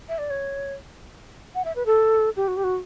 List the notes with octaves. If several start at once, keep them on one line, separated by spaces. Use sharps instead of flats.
E5
D5
C#5
F#5
E5
B4
A4
G4
F#4
G4
F#4